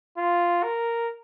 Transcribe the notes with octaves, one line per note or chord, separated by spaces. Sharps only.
F4
A#4